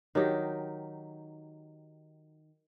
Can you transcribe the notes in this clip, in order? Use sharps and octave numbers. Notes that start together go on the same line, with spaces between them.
D#3 F#3 D#4 G4